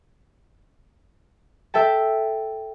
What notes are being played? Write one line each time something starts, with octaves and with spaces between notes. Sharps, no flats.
A4 E5 G5 A5